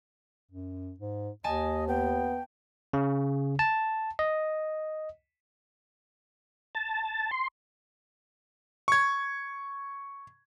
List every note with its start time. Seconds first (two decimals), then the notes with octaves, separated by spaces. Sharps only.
0.51 F#2
1.00 G#2
1.44 D#2 D#5 G#5 A5
1.88 B3 G5
2.93 C#3
3.59 A5
4.19 D#5
6.75 A5
7.31 C6
8.88 C#6 G#6